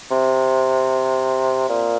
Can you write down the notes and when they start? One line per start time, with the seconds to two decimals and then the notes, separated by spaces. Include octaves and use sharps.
0.11 C3
1.69 A#2